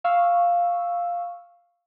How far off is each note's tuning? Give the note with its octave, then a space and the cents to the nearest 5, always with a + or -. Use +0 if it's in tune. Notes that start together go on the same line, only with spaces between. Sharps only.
F5 +0 C#6 +0 E6 +0